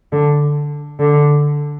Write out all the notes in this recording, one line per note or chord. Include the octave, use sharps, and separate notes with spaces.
D3
D3